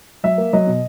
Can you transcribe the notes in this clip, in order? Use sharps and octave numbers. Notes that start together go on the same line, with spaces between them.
F#3 E5
A#3
F#3 D#5
B2